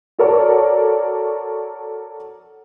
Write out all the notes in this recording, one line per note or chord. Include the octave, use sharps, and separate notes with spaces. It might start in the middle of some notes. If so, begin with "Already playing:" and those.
F#4 A4 A#4 C#5 D5